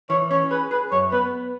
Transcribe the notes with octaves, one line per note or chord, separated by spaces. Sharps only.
E3 C#5
C#4 C#5
G#4 B4
G#4 B4
F#2 C#5
B3 B4